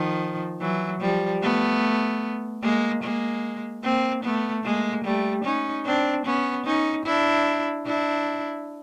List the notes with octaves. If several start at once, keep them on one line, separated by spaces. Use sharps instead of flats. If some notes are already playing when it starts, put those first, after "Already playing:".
Already playing: D#3 F3
E3 F#3
F3 G3
A3 B3
G#3 A#3
G#3 A#3
A#3 C4
A3 B3
G#3 A#3
G3 A3
C#4 D#4
C4 D4
B3 C#4
C#4 D#4
D4 E4
D4 E4